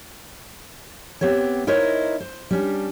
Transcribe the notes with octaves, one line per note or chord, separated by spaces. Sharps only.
B3 C4 G4 C#5
D#4 E4 A#4 C5 C#5 D#5
C5
G3 C#4 D4